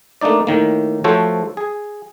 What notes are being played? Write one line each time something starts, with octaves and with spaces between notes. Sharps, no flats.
A3 A#3 D4 D#4 D5
A2 D#3 A#3
F3 A3 F#4 A4 C5 C#5
G#4